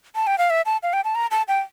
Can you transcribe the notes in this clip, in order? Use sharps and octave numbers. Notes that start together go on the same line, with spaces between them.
A5
G5
F5
E5
A5
F5
G5
A5
A#5
A5
G5